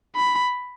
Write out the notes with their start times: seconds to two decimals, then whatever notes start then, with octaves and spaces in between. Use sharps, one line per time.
0.16 B5